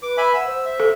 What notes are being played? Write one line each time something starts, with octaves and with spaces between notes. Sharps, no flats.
B4 D6
E5 G#5 B5
F#5 E6
C5
E5
A4